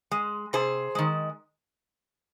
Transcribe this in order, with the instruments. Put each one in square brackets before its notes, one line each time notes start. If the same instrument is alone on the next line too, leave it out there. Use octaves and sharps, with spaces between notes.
[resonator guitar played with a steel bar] G#3
C3 G#4 C5
D#3 G#3